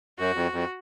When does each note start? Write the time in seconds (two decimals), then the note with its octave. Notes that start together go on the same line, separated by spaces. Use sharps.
0.18 F#2 F#4
0.36 F2
0.53 F2